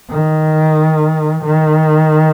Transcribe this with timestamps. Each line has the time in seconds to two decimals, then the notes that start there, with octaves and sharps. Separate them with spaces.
0.11 D#3
1.44 D#3